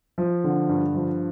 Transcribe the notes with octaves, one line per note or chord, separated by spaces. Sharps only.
F3
D3
G2
F3